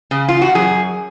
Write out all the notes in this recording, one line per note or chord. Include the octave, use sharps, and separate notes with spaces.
C#3
F4
F#4
F#2 G#4